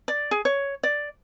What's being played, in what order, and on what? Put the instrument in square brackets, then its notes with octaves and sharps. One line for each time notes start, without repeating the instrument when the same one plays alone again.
[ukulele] D5
G#4
C#5
D5